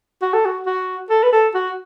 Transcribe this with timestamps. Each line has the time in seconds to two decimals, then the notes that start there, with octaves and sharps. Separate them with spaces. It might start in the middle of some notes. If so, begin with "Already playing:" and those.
0.22 F#4
0.34 A4
0.45 F#4
0.66 F#4
1.10 A4
1.23 B4
1.32 A4
1.54 F#4